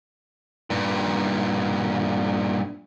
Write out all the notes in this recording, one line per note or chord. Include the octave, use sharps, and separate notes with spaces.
G2 A#2